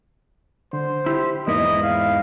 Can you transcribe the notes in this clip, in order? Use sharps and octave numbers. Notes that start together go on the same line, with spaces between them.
D3 C5
E4 G4
E2 G#2 A#3 D#4 E4 D#5
F5